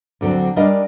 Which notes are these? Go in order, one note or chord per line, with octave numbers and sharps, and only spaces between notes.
D2 D3 F#3 C4
G3 D4 A#4 D5 D#5 F5